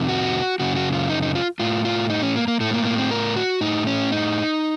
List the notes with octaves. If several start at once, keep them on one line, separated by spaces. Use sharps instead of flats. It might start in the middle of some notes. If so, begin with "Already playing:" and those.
Already playing: F2 C3 D#3
F#4
F#2 C#3 F#4
F#4
F4
D#4
D#4
F4
A2 F4
F4
D#4
C#4
A#3
A#3
A2 A3
A#3
A#3
C4
A#4
F#4
A2 D#4
C#4
D#4